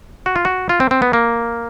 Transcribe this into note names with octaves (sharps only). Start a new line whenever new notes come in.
F#4
F4
F#4
F4
C4
C4
B3
A#3